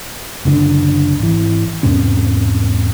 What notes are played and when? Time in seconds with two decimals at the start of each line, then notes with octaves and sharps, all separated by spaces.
0.45 F#1 C#2 D3 D4
1.20 G#1 E3
1.83 E2 G#2 C3 C#4